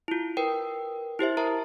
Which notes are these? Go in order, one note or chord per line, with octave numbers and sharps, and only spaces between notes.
E4 F4
A#4 B4 G5
E4 G4 C5 E5
A#4 E5 A5 A#5